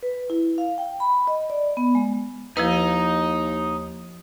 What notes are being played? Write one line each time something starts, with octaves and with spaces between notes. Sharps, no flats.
B4
E4
F5
G5
B5
D#5
D5
B3
G#3
D#2 F3 D#4 E4 B4